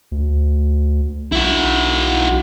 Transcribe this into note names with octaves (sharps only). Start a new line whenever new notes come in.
D2
B1 E4 F#4